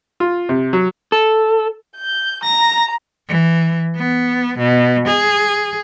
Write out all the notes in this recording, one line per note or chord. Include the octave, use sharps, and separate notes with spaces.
F4
C3
F#3
A4
G6
A#5 A#6
E3
B3
B2
G#4